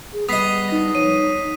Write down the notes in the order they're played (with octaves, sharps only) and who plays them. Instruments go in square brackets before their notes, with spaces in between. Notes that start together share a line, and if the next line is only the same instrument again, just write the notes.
[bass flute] G#4
[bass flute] G3 [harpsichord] B3 D#5 [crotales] D#6 B6 C7
[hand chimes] D#4 A#6
[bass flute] F3 [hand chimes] C#5 [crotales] D#7
[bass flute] D#4